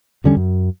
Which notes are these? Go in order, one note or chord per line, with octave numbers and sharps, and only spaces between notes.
E2 D3 G3 C#4
F#2